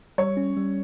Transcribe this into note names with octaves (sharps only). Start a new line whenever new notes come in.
G3 C#5
C#4
G3